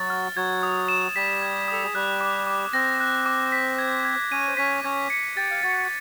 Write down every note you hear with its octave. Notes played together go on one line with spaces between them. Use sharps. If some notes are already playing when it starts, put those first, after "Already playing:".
Already playing: F#3 F#4 A6
F6
F#3 F#4 G#6
D#6
E7
G3 G4 B6
G#6
A4 D#6
G#4
G3 G4 F#6
D6
D6
C4 C5 A#6
F#6
D6
B6
G#6
G#6
C#4 C#5 D#7
C5
C#4 C#5 B6
C#4 C#5 G#6
C#7
G4 G5 A6
F5
F#4 F#5 A6